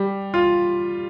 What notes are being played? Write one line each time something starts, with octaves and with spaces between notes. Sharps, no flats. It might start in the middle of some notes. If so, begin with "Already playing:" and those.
Already playing: G3
F4